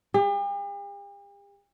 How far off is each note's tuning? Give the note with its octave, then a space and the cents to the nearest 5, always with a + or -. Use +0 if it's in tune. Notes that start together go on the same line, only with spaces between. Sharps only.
G4 +45